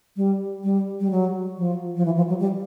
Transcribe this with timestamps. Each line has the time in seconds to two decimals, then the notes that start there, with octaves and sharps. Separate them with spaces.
0.17 G3
0.64 G3
1.00 G3
1.11 F#3
1.58 F3
1.96 F3
2.05 E3
2.16 F3
2.29 F#3
2.40 G3